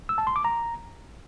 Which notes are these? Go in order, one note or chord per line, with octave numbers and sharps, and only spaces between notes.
E6
A5
C6
D6
A#5